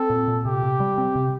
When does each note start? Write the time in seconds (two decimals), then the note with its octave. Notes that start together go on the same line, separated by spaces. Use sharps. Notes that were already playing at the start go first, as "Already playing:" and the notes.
Already playing: C4 A4
0.10 A#2
0.28 A#2
0.45 C3 G4
0.63 C3
0.80 G3
0.98 C4
1.15 C3